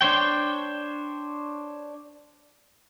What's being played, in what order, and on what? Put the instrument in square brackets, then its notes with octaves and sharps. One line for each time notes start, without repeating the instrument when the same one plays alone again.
[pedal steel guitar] D4 C5 C#5 G5